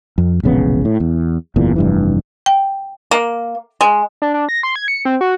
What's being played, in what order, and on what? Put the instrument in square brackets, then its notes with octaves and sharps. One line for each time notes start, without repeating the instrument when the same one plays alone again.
[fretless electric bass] F2
E1 A#1 C#3 B3
A2
E2
F#1 E2 A#2
F1 G2 E3
[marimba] G5
[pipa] A#3
G#3
[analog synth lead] D4
D4
A#6
C6
G#6
C#7
C4
F#4